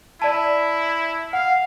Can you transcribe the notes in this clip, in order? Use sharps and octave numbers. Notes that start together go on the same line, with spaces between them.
E4 D5 A5
F5 F#5